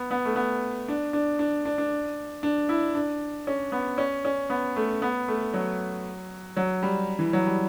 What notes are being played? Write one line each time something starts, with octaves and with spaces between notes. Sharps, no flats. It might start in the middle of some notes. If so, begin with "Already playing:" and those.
Already playing: B3
B3
A3
B3
D4
D4
D4
D4
D4
D4
E4
D4
C#4
B3
C#4
C#4
B3
A3
B3
A3
F#3
F#3
G3
E3
F#3
G3